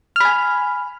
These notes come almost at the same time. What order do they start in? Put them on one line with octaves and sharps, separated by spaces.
F6 B5 G#5